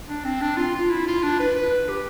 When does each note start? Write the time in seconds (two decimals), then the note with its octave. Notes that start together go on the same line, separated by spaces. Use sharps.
0.09 D4
0.24 C4
0.41 D4
0.57 F4
0.74 F4
0.91 E4
1.07 F4
1.23 D4
1.40 B4
1.55 B4
1.89 G4